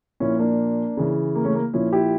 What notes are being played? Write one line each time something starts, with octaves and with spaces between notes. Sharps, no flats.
A#2 F3 C#4 E4
A#3 D4
C#3 E3
A#3
A3 C#4
A#3
A#2 F3 C#4 E4
E4 G4